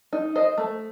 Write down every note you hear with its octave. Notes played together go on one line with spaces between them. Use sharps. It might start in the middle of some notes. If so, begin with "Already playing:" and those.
D#4
C5 D#5
A3